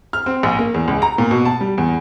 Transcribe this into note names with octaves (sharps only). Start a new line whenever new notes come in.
F6
C4
A#1
A#3
E2
C#2
A#5
A#2
B2
A5
G3
E2